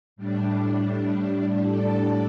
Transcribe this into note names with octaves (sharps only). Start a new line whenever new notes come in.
A2 G3 D4
A2 G3 D4 A4 D5